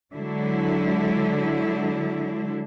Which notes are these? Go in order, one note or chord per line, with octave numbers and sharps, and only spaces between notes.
D3 F#3 G#3 E4